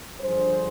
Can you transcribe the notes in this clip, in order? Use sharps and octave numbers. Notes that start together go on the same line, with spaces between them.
G2 D3 F3 G#4 C5